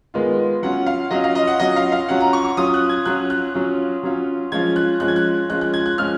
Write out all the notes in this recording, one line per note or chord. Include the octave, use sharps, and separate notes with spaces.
D#3 G#3 B3 F4
F#3 C#4 F4 F#5
F5
F#3 C#4 F4 D#5
F5
D#5
F#5
F#3 C#4 F4 D#5
F5
F5
F#3 C#4 F4 F#5
A#5
C#6
C#6
F#3 C#4 F4 D#6
F#6
G#6
F#3 C#4 F4 F#6
F#6
F#3 C#4 F4
F#3 C#4 F4
F3 G#3 C#4 F4 G#6
F#6
F3 G#3 C#4 F4 F#6
G#6
F#6
F3 G#3 C#4 F4 F#6
F#6
G#6
F#6
F3 G#3 C#4 F4 F6